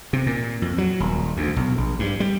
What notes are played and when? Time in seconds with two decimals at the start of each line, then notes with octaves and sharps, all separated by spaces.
0.13 C3
0.27 A#2
0.62 F2
0.78 F#3
1.00 D#1
1.37 D2
1.56 B1
1.78 A#1
1.99 G2
2.20 G3